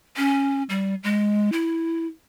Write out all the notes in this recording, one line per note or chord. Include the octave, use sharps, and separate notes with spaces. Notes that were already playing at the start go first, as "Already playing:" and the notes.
C#4
G3
G#3
E4